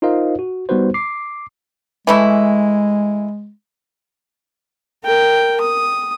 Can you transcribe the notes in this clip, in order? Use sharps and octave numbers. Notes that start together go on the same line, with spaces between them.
D#4 F4 A#4 C5 D#5 F5
F#4
G3 B3 D#4 F#4 B4 C5
D6 C7
E3 G#3 A3 E4
A#4 G5
D#6